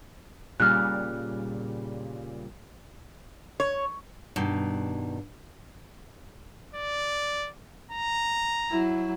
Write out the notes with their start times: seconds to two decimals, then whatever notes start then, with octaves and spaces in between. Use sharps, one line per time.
0.60 A#2 C#3 G3 F6 F#6
3.60 C#5
4.36 G2 B2 D#3
6.75 D5
7.91 A#5
8.71 F#3 E4